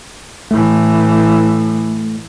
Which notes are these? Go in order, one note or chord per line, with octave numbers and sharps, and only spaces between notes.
A2 E3 A3